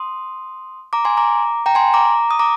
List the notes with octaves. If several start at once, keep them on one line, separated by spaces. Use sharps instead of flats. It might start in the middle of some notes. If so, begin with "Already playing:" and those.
Already playing: C6 D#6
A#5 D6
G#5 C6
A#5 D6
G5 A#5
G#5 C6
A#5 D6
D#6
A#5 D6